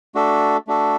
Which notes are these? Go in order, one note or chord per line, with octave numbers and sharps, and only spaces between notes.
A3 D4 F#4 A4
A3 D4 F#4 A4